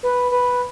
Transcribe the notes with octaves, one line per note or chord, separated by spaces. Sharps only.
B4
B4